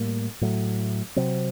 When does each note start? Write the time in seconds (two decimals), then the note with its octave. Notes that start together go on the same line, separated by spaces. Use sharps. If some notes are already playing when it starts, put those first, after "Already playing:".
Already playing: A2 G3 A#3
0.41 A2 F#3 A3
1.16 C3 F#3 C4